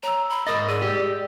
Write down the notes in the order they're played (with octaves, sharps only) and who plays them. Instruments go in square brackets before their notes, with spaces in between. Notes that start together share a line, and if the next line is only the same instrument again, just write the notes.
[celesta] C#5 E6 [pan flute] A#5
[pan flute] B5
[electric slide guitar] G#2 D#5 [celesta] A#4 A6 [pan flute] D#6
[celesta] G#4 E6 D#7 [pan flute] D5
[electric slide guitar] G4